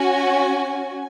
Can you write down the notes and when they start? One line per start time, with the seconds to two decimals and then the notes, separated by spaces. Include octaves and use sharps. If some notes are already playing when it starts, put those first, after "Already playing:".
Already playing: C#4 F#4 G#5